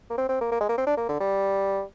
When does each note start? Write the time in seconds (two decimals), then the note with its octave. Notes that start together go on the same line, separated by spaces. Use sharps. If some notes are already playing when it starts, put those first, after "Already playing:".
0.10 A#3
0.18 C4
0.28 C4
0.41 A#3
0.51 A#3
0.60 G#3
0.69 A#3
0.77 C4
0.87 D4
0.97 A#3
1.09 D3
1.20 G3